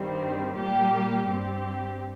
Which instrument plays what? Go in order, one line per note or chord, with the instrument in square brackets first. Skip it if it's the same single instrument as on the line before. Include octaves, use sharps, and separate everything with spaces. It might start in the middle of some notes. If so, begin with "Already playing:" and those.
Already playing: [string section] G2 D#3 G3 C4
A#2 G3 A#3 G4
G2 G3 C4 G4